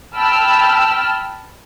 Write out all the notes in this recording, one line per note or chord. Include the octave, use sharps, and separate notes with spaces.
G5 A5 B5 E6 F6